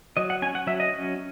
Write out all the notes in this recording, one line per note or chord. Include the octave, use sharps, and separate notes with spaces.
F#3 D#5
F#5
C#4 G#5
F#5
F#3 E5
D#5
C#4